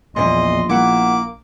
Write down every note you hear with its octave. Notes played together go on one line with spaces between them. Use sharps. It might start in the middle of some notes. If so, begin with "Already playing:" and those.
A#1 E2 A#2 D#5 C6
A#3 E4 F#5 D6